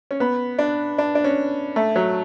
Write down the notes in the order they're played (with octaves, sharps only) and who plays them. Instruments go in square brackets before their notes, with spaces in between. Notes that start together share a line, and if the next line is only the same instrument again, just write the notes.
[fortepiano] C#4
B3
D4
D4
D4
C#4
A3
F#3